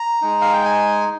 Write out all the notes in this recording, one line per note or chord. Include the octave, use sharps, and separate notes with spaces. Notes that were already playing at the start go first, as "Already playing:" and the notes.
Already playing: A#5
G#3 D#4
F5
G5
G#5